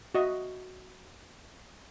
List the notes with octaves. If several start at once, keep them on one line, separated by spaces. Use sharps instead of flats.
F#4 D#5 E5